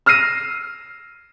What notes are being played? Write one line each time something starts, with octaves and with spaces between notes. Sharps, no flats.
E6 F6 A#6 C7 D#7 E7